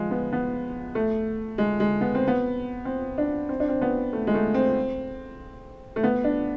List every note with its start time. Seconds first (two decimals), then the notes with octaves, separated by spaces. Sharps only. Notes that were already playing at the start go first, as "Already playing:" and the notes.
Already playing: F3 G#3
0.11 B3
0.32 B3
0.95 A3
1.58 G#3
1.80 G#3
2.01 B3
2.15 C4
2.28 B3
2.85 C4
3.18 D4
3.49 C4
3.60 D4
3.69 C4
3.81 B3
4.13 A3
4.27 G#3
4.34 A3
4.54 C4
5.96 A3
6.03 B3
6.24 D4